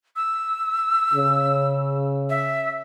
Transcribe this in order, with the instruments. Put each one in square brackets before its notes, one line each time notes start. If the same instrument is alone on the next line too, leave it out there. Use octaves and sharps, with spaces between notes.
[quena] E6
[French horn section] C#3
[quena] E5